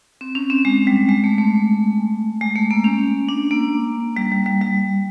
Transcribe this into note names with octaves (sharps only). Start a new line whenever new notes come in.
C4
C#4
C4
G#3
G3
G#3
A3
A3
G#3
A3
A#3
C#4
D4
A#3
G3
G3
G3
G3